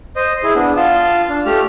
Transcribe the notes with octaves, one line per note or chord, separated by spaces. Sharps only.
C5 D#5
E4 G#4
B3 D4
F4 F5 A5
D4
A3 G4 F6